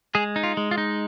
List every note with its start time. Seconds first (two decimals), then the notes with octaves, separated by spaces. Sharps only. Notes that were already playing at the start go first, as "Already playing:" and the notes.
0.15 G#3 G#4
0.36 D#4
0.43 F4
0.57 G#3
0.71 F4
0.78 D#4